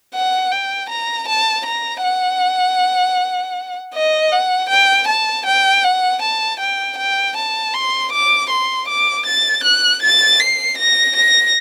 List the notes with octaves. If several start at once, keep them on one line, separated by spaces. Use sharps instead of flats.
F#5
G5
A#5
A5
A#5
F#5
D#5
F#5
G5
A5
G5
F#5
A5
G5
G5
A5
C6
D6
C6
D6
A6
F#6
A6
C7
A#6
A#6